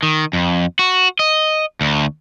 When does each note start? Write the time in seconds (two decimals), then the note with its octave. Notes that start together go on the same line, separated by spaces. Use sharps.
0.03 D#3
0.33 F2
0.79 F#4
1.19 D#5
1.81 D2